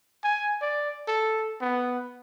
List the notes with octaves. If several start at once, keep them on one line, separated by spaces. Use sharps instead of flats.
G#5
D5
A4
B3